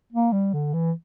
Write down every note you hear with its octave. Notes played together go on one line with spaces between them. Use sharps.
A#3
G3
D3
E3